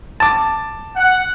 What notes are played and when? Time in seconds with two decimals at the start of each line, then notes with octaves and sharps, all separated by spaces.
0.20 A5 D6
0.96 F#5